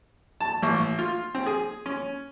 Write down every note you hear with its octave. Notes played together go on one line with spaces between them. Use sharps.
A5
A1
F4
C4
G#4
C#4